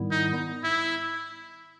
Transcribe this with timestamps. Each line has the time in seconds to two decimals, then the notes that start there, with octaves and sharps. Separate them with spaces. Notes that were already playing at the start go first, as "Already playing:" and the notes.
Already playing: G#2 D#3 G3 B3 E4
0.11 D#4
0.64 E4